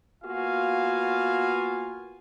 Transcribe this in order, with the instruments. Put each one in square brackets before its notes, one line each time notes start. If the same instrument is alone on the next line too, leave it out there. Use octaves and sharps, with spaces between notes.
[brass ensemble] A#3 B3 F4 F#4 F5 G#5